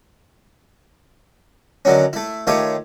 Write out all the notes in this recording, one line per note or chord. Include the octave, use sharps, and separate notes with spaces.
D3 D#3 F#3 C#4
A3 E4
D#3 A3 F4 G4 C#5